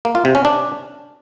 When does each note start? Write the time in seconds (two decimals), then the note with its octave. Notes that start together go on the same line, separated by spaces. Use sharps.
0.05 A#3
0.15 F4
0.25 C3
0.35 C#4
0.45 D4